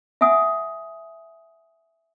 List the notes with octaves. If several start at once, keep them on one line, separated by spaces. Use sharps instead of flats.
E5 F#5 G#5 D#6